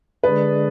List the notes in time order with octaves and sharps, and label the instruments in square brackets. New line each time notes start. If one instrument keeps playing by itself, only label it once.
[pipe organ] D3 G#3 D4 G#4 D5 [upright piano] B4